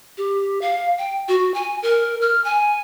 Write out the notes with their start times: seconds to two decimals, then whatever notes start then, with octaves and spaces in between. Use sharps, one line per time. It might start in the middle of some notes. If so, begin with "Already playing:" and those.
0.18 G4
0.62 F5
0.98 G5
1.28 F#4
1.54 G#5
1.83 A#4
2.21 F6
2.44 G#5